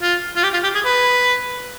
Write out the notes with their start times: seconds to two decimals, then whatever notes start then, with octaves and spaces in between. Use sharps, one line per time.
0.02 F4
0.36 F4
0.43 G4
0.53 F4
0.63 G4
0.75 G#4
0.85 B4